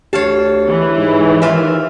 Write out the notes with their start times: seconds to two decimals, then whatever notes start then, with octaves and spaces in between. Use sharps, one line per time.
0.13 D2 G4 C#5 F5 A5
0.68 E3
0.98 G#2
1.42 D#3 F4 E5